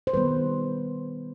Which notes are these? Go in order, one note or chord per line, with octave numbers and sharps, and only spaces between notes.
C5
D#3 G3 B3 B4